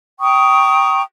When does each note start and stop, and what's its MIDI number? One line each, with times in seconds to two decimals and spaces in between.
0.20 1.02 79
0.20 1.02 82
0.20 1.02 85
0.20 1.02 87